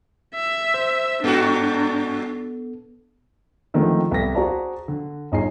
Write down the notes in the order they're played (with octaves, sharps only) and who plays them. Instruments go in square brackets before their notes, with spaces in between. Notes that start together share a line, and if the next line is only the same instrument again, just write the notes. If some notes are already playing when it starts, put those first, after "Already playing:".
[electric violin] E5
[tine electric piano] C5
[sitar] G2 F#4 [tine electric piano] B3 A4 [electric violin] D4
[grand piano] D3 D#3 F3 G#3 A3 C4
C2 B3 A4 A#6 B6
F#4 G#4 C5 D5 A5 A#5
D3
G1 D#4 G#4 C7